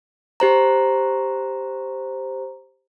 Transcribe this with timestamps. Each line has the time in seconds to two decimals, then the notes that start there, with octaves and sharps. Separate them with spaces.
0.40 G4 C5 A#5